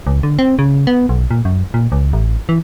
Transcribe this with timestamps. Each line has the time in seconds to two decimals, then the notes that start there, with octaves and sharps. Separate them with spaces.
0.07 C#2
0.23 D3
0.39 C4
0.59 C#3
0.87 B3
1.09 B1
1.31 A#2
1.45 F#2
1.74 A#2
1.92 C#2
2.13 A1
2.49 E3